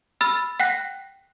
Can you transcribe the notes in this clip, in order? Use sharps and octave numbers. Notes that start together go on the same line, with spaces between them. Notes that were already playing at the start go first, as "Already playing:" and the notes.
B5 E6 F6 A6
F#5 G5 F#6 A#6